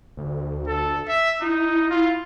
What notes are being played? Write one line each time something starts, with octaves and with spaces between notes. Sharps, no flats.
D2
A4
E5
D#4 E4
F4